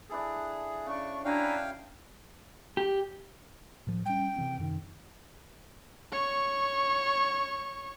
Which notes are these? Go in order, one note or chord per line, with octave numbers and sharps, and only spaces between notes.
D4 E4 G#4 A4
C#3 D4 C#6
D4 E4 F#4 F5 G5 G#5 A#5
G4
A2 F3
G3 C#4 G5
C3 E3 C4
F#2 C3 D#3
C#5 C#6